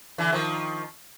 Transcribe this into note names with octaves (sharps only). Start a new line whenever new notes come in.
D3 E3
D#3 F3